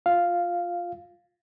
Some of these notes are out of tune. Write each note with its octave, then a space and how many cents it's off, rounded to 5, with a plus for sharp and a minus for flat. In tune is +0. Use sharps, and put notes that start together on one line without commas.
F4 +10 F5 +0